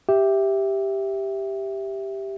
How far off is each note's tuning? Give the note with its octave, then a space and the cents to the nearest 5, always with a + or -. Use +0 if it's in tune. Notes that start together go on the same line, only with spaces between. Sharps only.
G4 +0 E5 +0